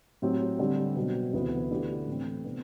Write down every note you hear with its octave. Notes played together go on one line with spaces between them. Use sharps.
A2 F#3 C4 G4
D3 G3 C4 G4
B2 F#3 C4
D2 C3 E3 B3
D3 A3 E4 G4
A2 E3 A3 C4
C3 E3 B3 D4